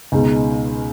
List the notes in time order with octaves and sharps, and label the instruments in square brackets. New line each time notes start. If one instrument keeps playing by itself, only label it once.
[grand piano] C#2 B2 G#3 D#4